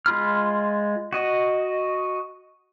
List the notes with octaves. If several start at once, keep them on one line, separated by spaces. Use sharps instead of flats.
G#3 F4 B5 F6
F#4 D#5